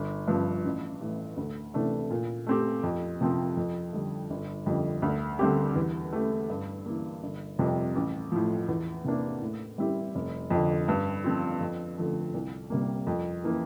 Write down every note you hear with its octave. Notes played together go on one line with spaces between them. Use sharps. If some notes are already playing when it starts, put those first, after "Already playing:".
Already playing: G1
G2 F3
A1
A2 E3
D2
C3 E3 A3 D4
A#2
A3 C4 G4
F2
C3 F3 C4
F2
D3 G3
G1
F2 D3 G3
D2
D3 G3 C4 G4
E2
E3 A3 E4 G4
G2
E3 A#3
G1
F2 C3 G3
A1
A2 F3
E2
C3 E3 A#3 D4
A2
G3 C4 E4 G4
F1
F2 D3
G2
F3 C4 F4
F2
D3 F3 A3
C2
C3 G3 A#3
F2
E3 A#3